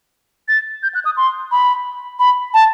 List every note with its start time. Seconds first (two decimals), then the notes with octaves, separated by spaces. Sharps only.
0.48 A6
0.83 G6
0.95 F#6
1.05 D#6
1.17 C6
1.52 B5
2.19 B5
2.54 A5